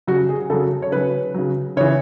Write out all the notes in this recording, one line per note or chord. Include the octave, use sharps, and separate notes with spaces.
C#3 F#3 F#4
G#4
C#3 F#3 A4
C#5
C#3 F#3 B4
C#3 F#3
C#3 E3 C#5